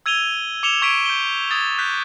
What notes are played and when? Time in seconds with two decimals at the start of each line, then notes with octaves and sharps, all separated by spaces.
0.06 E6 G#6 D#7 F7 G7
0.63 D6 C#7 E7 F7 G7
0.82 C#6 G#6 B6 D7 D#7
1.06 G6 G7
1.51 D#6 G#6 A6
1.78 F#6 G6 B6